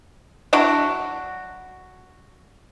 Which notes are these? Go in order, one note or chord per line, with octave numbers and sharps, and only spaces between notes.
F#3 D4 E4 F#4